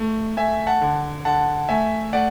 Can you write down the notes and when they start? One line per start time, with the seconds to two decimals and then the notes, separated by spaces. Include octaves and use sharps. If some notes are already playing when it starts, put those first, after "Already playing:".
Already playing: A3
0.37 A3 E5 G#5
0.67 F#5 A5
0.81 D3
1.25 D3 F#5 A5
1.69 A3 E5 G#5
2.13 A3 D5 F#5